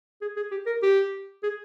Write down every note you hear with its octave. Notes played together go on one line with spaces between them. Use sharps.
G#4
G#4
G4
A#4
G4
G#4